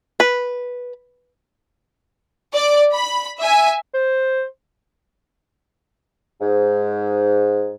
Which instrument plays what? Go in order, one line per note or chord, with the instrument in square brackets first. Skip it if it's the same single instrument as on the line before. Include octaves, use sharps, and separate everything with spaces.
[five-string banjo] B4
[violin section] D5
B5
E5 G#5
[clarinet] C5
[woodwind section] G#2